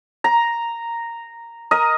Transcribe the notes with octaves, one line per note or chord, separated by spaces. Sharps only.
A#5
A#4 D#5